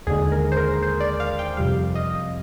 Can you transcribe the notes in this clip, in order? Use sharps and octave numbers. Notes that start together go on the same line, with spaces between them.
D#2 D3 G#3 G#4
A#4
C5
A#4
C5
D5
F5
G5
F2 C3 G3 F5
D#5